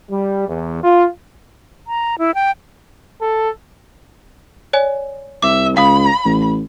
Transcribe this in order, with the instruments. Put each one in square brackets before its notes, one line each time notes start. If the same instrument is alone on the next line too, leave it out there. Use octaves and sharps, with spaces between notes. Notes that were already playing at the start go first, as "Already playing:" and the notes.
[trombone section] G3
E2
F4
[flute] A#5
E4
G5
[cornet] A4
[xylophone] C#5 D5 G#5
[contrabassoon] C2 [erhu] E5 [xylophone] D6
[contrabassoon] C#2 [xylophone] F5 D#6 [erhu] B5
[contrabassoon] A1